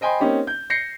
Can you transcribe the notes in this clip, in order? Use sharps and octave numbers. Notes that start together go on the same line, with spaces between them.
C5 D#5 G5 G#5 B5 C6
A#3 C4 C#4 D#4 G4
G6
G6 A#6 C7 C#7